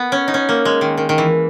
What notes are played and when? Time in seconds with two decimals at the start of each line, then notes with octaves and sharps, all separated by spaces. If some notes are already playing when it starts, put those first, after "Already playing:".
Already playing: B3
0.12 C#4
0.28 D#4
0.34 C#4
0.49 A#3
0.65 G#3
0.81 D#3
0.98 D#3
1.09 D#3
1.18 E3